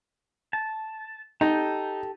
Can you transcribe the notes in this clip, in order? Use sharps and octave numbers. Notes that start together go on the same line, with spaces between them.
A5
D#4 G4 A4